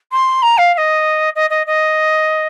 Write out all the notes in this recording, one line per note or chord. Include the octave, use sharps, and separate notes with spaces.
C6
A#5
F5
F5
D#5
D#5
D#5
D#5